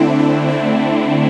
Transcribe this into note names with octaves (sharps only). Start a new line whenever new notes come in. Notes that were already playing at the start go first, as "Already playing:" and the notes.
Already playing: D3 A3 C4 D4 E4
D4
C4 E4